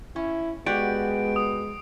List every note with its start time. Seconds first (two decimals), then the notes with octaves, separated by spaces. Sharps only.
0.16 C#4 E4
0.66 G#3 B3 F#4 G4 D5 D7
1.36 D#6